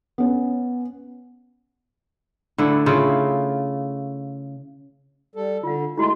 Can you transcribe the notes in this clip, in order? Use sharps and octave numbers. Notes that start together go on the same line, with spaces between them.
B3 C#4
D3 A3 E4
C#3 E4 F4
G3 A4
D3 F4 F5
G#3 A3 E4 F#4 C6